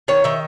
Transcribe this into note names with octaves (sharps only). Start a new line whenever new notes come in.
D#3 C#5
D#3 E5